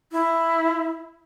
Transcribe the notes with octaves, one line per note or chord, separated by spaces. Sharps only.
E4